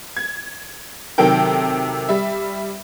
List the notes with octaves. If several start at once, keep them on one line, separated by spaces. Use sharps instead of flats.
G#6
C3 D#3 F#3 A4 A#4 G5
G3 E5